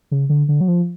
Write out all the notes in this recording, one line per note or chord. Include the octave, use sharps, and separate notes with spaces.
C#3
D3
D3
F#3
F3